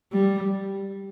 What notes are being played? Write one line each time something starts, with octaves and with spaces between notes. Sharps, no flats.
G3